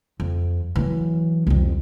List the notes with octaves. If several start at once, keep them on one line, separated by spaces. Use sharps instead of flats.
F2
E3 F#3
C2 F2